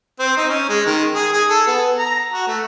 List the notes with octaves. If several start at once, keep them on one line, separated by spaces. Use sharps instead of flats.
C4
D#4
C#4
G#3
D#3
G#4
G#4
A4
B3
A#5
F#4
A3